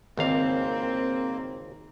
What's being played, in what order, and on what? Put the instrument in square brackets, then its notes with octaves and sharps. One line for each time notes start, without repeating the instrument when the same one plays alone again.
[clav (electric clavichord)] G#1 C#2 F5 [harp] D#3 D6 [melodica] A#3 [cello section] C4